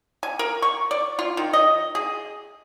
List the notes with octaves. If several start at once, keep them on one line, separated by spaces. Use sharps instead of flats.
G#5
A#4
C#6
D5
F4
D#3
D#5
G#4